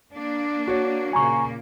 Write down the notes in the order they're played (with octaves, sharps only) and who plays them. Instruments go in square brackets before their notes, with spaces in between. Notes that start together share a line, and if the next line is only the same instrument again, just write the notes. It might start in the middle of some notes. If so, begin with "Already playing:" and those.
[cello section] A#3 D4
[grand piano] F#4 C#5
[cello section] A#2 C#3 A#3 [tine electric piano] G#5 A#5 C#6